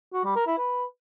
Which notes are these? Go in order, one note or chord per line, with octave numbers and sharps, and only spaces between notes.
F#4
G3
A#4
E4
B4